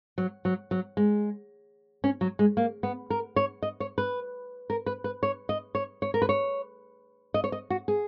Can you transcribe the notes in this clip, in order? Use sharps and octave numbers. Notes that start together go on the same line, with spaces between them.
F#3
F#3
F#3
G#3
C#4
F#3
G#3
A#3
B3
A#4
C#5
D#5
C#5
B4
A#4
B4
B4
C#5
D#5
C#5
C#5
A#4
B4
C#5
D#5
C#5
D#5
F#4
G#4